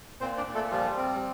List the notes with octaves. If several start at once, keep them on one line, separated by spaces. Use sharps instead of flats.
A#2 C4 C5
D4 D5
A#2
A3 A4
F3 G3 F4
C4